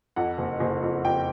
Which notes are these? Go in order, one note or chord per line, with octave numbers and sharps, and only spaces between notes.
F2 F#5
F#1
F#1
F2
F2 G5